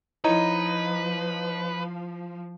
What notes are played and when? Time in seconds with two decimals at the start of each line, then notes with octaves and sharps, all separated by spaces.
0.24 F3 D#4 E4 B4 C#5 D#5 A#5